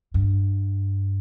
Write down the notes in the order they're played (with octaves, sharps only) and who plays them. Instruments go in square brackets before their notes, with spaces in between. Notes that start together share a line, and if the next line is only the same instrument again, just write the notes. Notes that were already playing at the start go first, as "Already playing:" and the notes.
[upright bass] G2